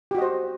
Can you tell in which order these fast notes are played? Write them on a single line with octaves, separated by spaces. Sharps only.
G4 F#4 D#5 C5